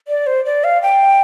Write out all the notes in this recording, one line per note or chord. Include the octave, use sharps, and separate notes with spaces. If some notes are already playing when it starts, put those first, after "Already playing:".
D5
C5
D5
F5
G5